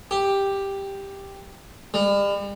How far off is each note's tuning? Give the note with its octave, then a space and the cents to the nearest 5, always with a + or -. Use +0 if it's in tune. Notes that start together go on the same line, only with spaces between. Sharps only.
G4 +5
G3 +40